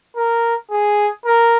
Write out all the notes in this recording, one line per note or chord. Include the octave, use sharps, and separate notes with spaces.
A#4
G#4
A#4